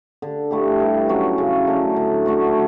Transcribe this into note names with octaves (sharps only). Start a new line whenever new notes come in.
D3
A3 E4 G4
G2
F#3 C#4
C#3
F#3 A3 D4
D3
A3 D4 F#4